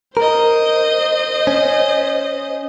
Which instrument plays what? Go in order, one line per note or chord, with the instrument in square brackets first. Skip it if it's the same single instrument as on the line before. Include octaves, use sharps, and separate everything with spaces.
[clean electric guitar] A#4 [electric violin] C5 D#5
[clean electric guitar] C#4